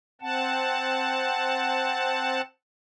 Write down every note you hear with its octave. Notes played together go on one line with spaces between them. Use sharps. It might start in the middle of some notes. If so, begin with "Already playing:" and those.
C4 F#5 A5